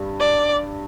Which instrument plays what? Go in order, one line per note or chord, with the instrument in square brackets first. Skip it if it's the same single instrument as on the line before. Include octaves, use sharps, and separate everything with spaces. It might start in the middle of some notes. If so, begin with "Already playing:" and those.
Already playing: [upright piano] G2 G3
[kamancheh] D5